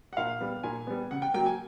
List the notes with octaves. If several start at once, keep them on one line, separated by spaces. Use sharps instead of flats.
F#5
A#2 F5
G3 B3
A#2 G#5
G3 B3
C#3 F#5
G5
F#3 A#3 G5
G#5